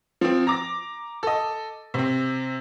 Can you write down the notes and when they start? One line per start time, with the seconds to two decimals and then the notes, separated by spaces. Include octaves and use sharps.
0.21 F3 C4
0.47 A#5 D6 A#6
1.23 A4 D#5
1.94 C3 C4